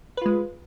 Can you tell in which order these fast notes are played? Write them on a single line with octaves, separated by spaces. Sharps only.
B4 F4 G#3